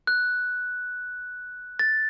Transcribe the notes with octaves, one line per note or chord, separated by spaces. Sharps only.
F#6
A6